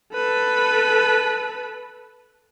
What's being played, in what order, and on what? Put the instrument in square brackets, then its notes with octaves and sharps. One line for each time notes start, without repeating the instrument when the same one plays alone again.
[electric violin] A4 B4